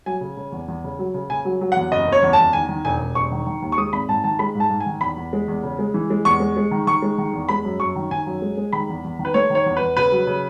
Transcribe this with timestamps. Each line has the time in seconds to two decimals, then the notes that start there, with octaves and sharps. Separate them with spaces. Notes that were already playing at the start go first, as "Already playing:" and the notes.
0.06 F#3 G#5
0.21 C#3
0.37 C#3
0.52 E2
0.68 E2
0.84 C#3
0.99 F#3
1.14 C#3
1.30 C#3 G#5
1.45 F#3
1.61 F#3
1.72 E2 F#5
1.92 F#1 D#5
2.08 F#1 C#5
2.23 E2
2.33 E2 A5
2.53 D#3 G#5
2.69 D#3
2.85 E1 G#5
3.00 E1
3.15 E1 C#6
3.31 D#3
3.47 D#3
3.62 D#2
3.72 C#6
3.78 G#3 D#6
3.93 G#1 B5
4.09 G#2 A5
4.24 D#3 A5
4.39 G#3 B5
4.55 G#2
4.60 A5
4.70 G#2
4.80 G#5
4.86 D#3
5.01 E2 B5
5.17 E2
5.33 G#3
5.48 E2
5.63 C#3
5.79 G#3
5.94 E3
6.10 G#3
6.25 E2 C#6
6.40 G#3
6.57 G#3
6.71 D#3
6.87 D#3 C#6
7.02 G#3
7.18 D#3
7.33 E2
7.49 G#3 B5
7.65 F#2
7.80 F#2 C#6
7.95 D#3
8.11 D#3 G#5
8.26 F#2
8.42 G#3
8.57 G#3
8.73 D#3 B5
8.89 E2
9.04 E2
9.19 D#3
9.25 B4
9.34 A3 C#5
9.50 D#3 C#5
9.66 E2
9.77 E2 B4
9.97 C#3 B4
10.12 F#3
10.27 C#3